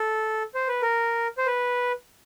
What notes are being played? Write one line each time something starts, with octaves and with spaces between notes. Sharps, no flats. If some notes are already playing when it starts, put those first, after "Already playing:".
Already playing: A4
C5
B4
A#4
C5
B4